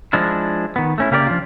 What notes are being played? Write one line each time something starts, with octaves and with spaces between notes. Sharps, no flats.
F3 G#3 D4 E4
D#3 B3
A3 C#4 E4
C#3 A#3 G4 A#4 C5 D5
F3 D4 F4